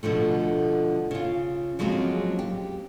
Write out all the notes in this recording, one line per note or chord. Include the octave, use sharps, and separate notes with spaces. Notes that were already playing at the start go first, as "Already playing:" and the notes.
B2 D3 F3 A3
C#3 F4
F3 F#3 G#3 A#3 C4 C#4
G4